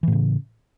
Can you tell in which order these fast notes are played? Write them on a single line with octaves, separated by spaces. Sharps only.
E3 A2 C#3